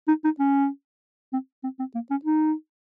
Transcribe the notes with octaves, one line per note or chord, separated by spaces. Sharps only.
D#4
D#4
C#4
C4
C4
C4
A#3
C#4
D#4